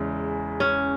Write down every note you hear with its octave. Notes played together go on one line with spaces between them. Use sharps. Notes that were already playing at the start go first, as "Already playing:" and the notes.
Already playing: E2 C#3 G#3
C#4